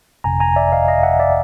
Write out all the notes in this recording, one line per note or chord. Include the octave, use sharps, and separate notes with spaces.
G1 F2 C3 G#5 A#5
G#5 A#5
D5 E5
D#5 F5
D#5 F5
E5 F#5
D5 E5